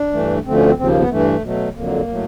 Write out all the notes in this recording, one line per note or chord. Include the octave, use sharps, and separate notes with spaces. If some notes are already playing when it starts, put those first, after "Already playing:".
Already playing: D4
G2 E3 A3
D2 D3 F3 A3 C4
C#4
C4
D#2 C#3 F3 C4
A#3
B3
G2 E3 A3
B2 F#3 A3
F2 D3 F#3 A#3
A2 F#3 A3